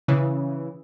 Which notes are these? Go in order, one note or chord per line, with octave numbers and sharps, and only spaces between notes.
C#3 E3